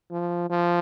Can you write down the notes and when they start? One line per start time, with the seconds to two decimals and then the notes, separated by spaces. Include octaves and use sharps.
0.11 F3
0.50 F3